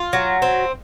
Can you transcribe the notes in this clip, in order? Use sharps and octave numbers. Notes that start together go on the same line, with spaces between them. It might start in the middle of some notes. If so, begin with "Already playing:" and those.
Already playing: F4
F#3
C4